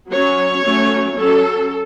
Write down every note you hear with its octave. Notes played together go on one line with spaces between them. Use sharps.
F#3 C#4 C#5
F#3 A3 C#4
F#3 C#4 A4